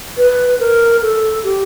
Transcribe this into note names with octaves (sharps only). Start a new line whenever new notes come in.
B4
A#4
A4
G4